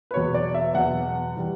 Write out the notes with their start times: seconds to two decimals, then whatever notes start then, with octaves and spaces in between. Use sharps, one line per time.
0.11 B4
0.14 E2 B2 F#3 C#5
0.34 D5
0.54 E5
0.75 E2 B2 F#3 F#5
1.37 E3 G3